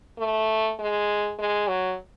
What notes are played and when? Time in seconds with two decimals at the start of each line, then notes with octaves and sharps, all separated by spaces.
0.18 A3
0.79 G#3
1.39 G#3
1.68 F#3